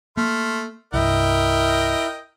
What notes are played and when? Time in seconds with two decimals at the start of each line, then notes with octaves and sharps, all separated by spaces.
0.17 A3 A#3 C6 F6
0.94 C2 G2 E4 A#4 D#5 G5